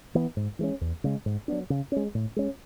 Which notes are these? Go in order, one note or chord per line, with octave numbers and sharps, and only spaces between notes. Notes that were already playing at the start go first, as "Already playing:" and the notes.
E3 B3
G#2
E3 G#3 C#4
E2
C#3 G#3
G#2
F#3 B3 D4
C#3
G#3 C#4
A2
G#3 C#4